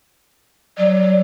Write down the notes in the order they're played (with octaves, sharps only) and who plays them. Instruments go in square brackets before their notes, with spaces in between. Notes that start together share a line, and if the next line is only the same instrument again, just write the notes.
[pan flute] F#3 [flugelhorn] D5